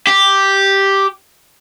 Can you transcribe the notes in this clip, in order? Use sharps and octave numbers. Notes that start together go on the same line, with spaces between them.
G4